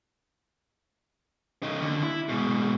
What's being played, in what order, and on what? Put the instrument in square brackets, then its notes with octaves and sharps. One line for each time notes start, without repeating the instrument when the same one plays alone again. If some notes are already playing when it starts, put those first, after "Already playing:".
[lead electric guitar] C#3 D#4
D#2 D3
E4
G#2 B2